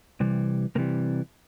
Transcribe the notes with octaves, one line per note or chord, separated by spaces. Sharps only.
C3 E3 G3
C3 E3 G3 A#3